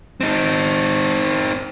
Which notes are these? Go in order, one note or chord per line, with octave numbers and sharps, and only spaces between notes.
C4 D#4